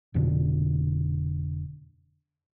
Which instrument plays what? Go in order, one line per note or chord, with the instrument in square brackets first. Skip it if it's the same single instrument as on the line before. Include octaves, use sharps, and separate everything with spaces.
[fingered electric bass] F1 F2 B2 D3